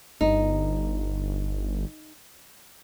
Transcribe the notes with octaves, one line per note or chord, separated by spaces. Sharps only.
G1 D#4